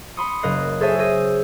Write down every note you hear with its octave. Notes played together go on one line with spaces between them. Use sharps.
B5 C6 D#6 C#7
F#1 A#4 D#5 F#6 C7
G#4 A4 C5 C#5 E5 G#5
G#4 E6 G6 A#6 D#7